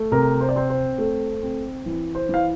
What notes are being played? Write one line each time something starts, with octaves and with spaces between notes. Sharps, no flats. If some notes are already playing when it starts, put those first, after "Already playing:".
Already playing: A3
C3 A#4
C5
D5
C4 C5
C5
A3
C4
E3
C5
E3 F5